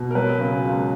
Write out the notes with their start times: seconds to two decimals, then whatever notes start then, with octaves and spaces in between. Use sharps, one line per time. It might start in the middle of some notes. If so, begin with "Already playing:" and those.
Already playing: B2
0.11 A#4
0.15 F#3 B4
0.40 C#3
0.63 C#2